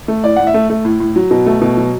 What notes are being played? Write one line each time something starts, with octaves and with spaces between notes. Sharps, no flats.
A3
A2 D5
A2 F#5
E5
A3
A3
A2
A2
F#3
B2
A3
B2
F#3